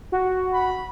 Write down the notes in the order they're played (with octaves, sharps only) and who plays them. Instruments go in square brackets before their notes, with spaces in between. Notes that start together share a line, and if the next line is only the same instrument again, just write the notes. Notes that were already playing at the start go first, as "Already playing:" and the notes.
[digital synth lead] F#4
[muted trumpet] B5